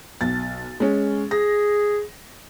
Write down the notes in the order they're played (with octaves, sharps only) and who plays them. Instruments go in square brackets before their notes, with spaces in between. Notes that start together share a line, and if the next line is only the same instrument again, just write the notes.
[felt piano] B1 A6
G#3 C#4
[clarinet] G#4 [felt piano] A#6